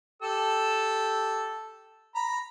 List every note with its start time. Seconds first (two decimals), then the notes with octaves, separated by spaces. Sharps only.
0.22 G4 A4 E6
2.15 A#5 B5